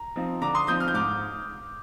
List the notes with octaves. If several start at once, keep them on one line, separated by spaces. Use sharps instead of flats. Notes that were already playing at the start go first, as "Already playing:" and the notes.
Already playing: A#5
F3 C4 D#4
D3 A#5 D6
C6 D#6
F3 C4 D#4 D#6 G6
F6
G6
G#2 D6 F6